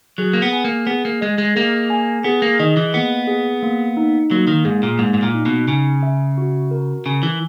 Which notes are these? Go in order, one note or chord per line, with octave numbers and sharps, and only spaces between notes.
F#3 G#4
A#3
B3
G#5
A#3
B3 G#4
A#3
G#3 D#5
G#3
A#3 G#4
G#5
B3 G#4
A#3
D#3 D#5
E3
A#3 B3
G#4
A#3
D#4
F#3 A#3
D#3
G#2 G#4
A#2
G#2 A#3
G#2
A#2
D#4
B2
C#3 G#5
E5
F#4
A#4
C#3 G#5
E3